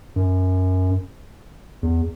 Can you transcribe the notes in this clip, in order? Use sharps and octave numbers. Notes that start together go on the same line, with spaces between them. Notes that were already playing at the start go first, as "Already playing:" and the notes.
F#2
E2